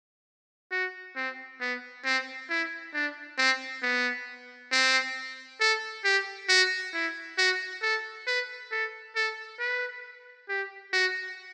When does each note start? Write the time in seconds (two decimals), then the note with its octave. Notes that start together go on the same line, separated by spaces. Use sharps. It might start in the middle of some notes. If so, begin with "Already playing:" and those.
0.72 F#4
1.16 C4
1.61 B3
2.05 C4
2.50 E4
2.94 D4
3.38 C4
3.83 B3
4.72 C4
5.61 A4
6.05 G4
6.49 F#4
6.94 E4
7.38 F#4
7.82 A4
8.27 B4
8.71 A4
9.16 A4
9.60 B4
10.49 G4
10.93 F#4